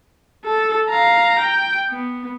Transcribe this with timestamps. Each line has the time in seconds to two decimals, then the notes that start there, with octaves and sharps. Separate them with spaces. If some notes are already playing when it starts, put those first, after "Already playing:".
0.45 A4
0.89 F5 A#5
1.40 G5
1.90 B3